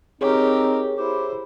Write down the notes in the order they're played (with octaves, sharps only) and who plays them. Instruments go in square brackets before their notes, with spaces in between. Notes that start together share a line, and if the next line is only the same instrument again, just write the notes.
[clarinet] C4 [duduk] D#4 [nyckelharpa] G4 A#4 [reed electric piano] G#4 C#5
[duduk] E4 [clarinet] G4 [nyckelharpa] C5